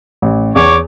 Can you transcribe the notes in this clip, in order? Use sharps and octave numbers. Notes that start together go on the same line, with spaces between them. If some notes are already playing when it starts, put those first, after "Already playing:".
A1
E2 C#5 D6